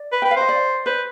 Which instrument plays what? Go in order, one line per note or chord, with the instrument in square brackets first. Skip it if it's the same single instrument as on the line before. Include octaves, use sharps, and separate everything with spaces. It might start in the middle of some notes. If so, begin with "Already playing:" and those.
Already playing: [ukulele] D5
[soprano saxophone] B4
[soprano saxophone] B4 [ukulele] G5
[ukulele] F5
[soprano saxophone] C5 [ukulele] D#5
[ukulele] D5
[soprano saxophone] B4 [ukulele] C5